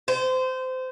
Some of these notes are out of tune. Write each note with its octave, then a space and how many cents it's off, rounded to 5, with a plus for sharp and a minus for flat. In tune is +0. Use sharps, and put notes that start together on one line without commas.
C5 -25